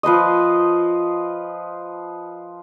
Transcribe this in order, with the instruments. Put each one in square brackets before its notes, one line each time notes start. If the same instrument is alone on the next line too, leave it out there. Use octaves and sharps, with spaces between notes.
[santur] F3 B4 C5 D#5